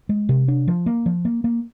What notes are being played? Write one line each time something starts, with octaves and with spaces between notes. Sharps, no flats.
G#3
C3
D4
F3
A#3
F3
A#3
A#3